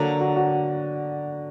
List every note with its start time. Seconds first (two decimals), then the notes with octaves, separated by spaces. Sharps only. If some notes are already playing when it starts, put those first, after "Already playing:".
Already playing: D3 F#3 A#3 D4
0.21 F#4
0.36 F#4